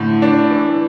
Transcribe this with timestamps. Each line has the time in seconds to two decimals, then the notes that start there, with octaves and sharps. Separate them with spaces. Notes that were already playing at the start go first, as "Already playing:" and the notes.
Already playing: A2 D3
0.22 D4
0.51 E3